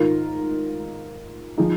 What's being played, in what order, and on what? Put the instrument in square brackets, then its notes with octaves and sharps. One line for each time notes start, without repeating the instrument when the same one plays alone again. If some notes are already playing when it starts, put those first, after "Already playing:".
Already playing: [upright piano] G#2 D#3 F4 A#4
F3 D#4 G#4